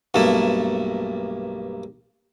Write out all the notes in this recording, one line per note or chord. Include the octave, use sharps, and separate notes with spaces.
B1 G2 A3 A#3 E4 A5